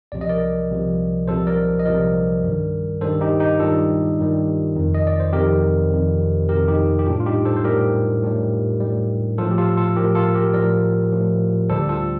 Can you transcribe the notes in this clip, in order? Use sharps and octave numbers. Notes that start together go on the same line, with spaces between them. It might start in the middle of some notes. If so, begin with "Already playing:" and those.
C2 C3 F3 D5
D#5
A#4 D5
C2 C3 F3
C2 C3 F3 A4 C5
A#4 D5
D#5
C2 C3 F3 A#4 D5
G2 D#3 G3
G2 D#3 G3 A4 C5
D#4 G4
D#4 G4
G2 D#3 G3 F4 A4
G2 D#3 G3
F2 C3 D#3
D#5
D5
C5
F2 C3 D#3 G4 A#4
F2 C3 D#3
F2 C3 D#3 G4 A#4
D#4 G4
G4
A2 G3 D4 F4
F4
D#4 G4
A4 C5
C5
A2 G3 G4 A#4
A2 G3
A2 G3
A2 F3 F4 A4
G4
F4 A4
F4 A4
A2 F3 G4 A#4
F4 A4
G4 A#4
A2 F3 A#4 D5
A2 F3
D2 D3 G3 A4 C5
F4 A4